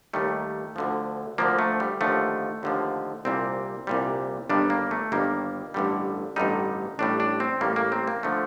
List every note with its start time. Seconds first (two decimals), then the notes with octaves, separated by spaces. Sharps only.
0.13 D#2 D#3 G3 A3
0.76 D2 D3 F3
1.38 D2 D3 F3 A#3
1.59 A3
1.80 G3
2.01 D#2 D3 F3 A3
2.63 D#2 D3 F3
3.25 C2 A#2 G3 C4
3.87 C2 A#2 G3
4.49 G1 G2 D#3 G3 D4
4.70 A#3
4.91 A3
5.12 G1 G2 D#3 G3 A#3
5.74 A1 G2 D3 G3
6.36 A1 G2 D3 G3 D#4
6.99 A1 A2 G3 D4
7.20 D4
7.40 C4
7.61 A1 A2 G3 A#3
7.76 A#3
7.92 C4
8.07 A#3
8.23 D3 F3 A3